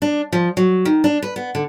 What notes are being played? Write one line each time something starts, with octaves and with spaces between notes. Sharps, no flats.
D4
F3
F#3
D#3
D4
B4
B3
D3